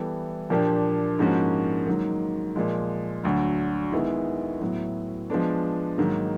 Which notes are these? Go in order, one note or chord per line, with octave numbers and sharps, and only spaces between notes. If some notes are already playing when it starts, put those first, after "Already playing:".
Already playing: E3 G3 B3 E4 A4
A#2 F3 A#3 D4 G4
G#2 F3 A#3 C#4 F#4
G#2 D#3 F#3 A#3
A#2 F3 G#3
D2 D3 F#3
D#3 G#3 B3 E4
A2 F#3 B3 E4
F3 G#3 B3 D4
G#2 D#3 F#3 A#3